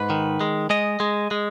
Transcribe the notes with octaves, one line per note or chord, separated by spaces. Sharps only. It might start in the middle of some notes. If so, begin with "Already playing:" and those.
Already playing: G#2 B4
D#3
G#3
G#3 D#5
G#3
G#3